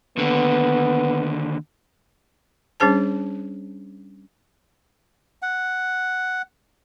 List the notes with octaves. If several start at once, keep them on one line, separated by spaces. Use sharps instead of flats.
D#2 D3 B3
G3 C#4 D4 G#4 C5 A5
F#5